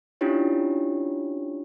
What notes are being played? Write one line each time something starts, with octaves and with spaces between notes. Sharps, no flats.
C#4 D4 E4 F4 G4 C#5